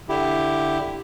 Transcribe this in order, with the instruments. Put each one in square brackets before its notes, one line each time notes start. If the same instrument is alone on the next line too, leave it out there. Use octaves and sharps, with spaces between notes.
[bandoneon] D3 E4 G4